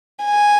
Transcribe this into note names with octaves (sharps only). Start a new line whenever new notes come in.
G#5